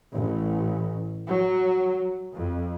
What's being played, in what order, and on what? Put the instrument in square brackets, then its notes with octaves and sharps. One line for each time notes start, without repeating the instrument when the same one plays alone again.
[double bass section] A1
F#3
F2